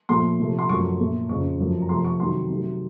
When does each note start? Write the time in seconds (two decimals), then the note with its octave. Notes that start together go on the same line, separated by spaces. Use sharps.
0.09 A#2 F3 A3 C6
0.39 C3 F3 A3
0.59 C6
0.69 F#2 F3 A3 C#6
0.99 A#2 A3
1.29 F2 C#3 F3 C#6
1.59 F#2 F3 A3
1.82 A#5
1.89 C3 F3 A3 C6
2.05 C#6
2.20 C3 D#3 F#3 A3 C6
2.50 C3 D#3 F#3 A3